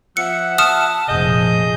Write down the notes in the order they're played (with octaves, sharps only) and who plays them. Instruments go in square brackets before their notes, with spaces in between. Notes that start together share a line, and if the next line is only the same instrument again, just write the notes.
[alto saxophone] F3 [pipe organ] E5 F#5 [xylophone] C#7
[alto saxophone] A5 [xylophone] D#6 F6 E7
[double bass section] F1 A#2 F3 [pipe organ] G#4 G6 [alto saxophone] D#5